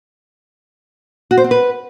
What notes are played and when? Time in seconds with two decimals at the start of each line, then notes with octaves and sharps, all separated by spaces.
1.31 F#4
1.37 C5
1.44 C4
1.51 B4